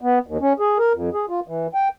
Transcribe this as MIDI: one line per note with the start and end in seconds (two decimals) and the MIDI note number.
0.01 0.19 59
0.27 0.37 39
0.41 0.53 61
0.59 0.78 68
0.78 0.93 70
0.94 1.10 41
1.14 1.26 68
1.29 1.40 65
1.47 1.67 52
1.74 1.88 79